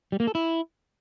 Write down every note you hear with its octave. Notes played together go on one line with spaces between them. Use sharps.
G3
A#3
A4
E4